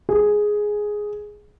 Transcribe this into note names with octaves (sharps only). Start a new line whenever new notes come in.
G#4